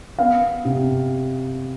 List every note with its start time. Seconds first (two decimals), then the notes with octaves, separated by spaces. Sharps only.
0.19 B3 F5
0.65 C3